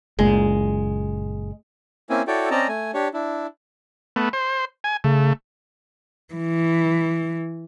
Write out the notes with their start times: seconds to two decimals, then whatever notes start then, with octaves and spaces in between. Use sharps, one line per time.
0.19 F#1 A#2 G#3
2.10 A#3 C4 C#4 E4 G#5
2.27 E4 F#4 A4 C#5 D5 G5
2.51 C4 C#4 D5 D#5 A5 A#5
2.68 A3 G#5
2.94 D4 G4 C#5
3.14 D4 E4
4.16 A3 B3
4.33 C5
4.84 G#5
5.04 C#3 A3
6.34 E3